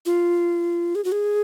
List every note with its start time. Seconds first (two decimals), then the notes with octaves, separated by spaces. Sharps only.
0.06 F4
0.95 G#4
1.05 F#4
1.12 G#4